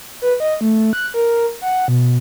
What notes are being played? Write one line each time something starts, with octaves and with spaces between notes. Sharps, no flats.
B4
D#5
A3
F#6
A#4
F#5
B2